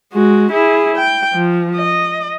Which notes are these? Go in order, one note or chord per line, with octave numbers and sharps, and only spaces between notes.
G#3 F#4
E4 G#4
G5
F3
D#5